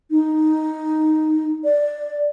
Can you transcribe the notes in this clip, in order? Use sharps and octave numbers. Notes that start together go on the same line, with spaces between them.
D#4
D5